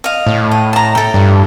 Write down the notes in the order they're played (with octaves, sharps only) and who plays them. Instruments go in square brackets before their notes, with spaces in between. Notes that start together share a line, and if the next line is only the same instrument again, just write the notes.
[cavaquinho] D#5 F5
[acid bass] A2
[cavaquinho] D#5
A5 A#5
A4 G5
[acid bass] G2